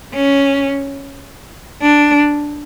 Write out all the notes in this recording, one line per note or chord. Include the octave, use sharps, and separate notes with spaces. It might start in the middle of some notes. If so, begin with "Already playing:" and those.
C#4
D4